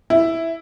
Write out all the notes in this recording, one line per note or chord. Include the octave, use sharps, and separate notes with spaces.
E4